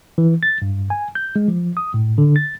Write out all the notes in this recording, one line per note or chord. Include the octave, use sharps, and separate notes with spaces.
E3
A6
G2
G#5
G6
G#3
F3
D#6
A2
D3
A6